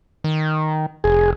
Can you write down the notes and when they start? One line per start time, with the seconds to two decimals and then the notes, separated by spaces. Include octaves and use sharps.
0.24 D#3
1.04 F1 G#4